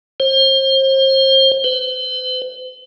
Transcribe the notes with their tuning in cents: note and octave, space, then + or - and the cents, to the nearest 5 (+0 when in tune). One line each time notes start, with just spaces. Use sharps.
C5 +35
C5 -45